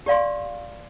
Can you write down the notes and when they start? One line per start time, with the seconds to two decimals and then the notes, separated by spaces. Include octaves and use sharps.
0.06 G4 D5 F5 C6